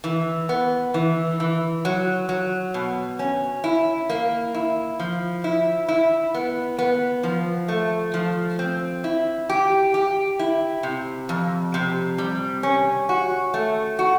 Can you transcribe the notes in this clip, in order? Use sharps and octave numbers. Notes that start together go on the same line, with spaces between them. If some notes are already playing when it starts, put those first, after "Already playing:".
E3
B3
E3
E3
F#3
F#3
B2
C#4
E4
A#3
E4
F3
E4
E4
B3
B3
F3
A3
F3
C4
E4
G4
G4
E4
C3
F2
C3
G3
C#4
F#4
A3
F#4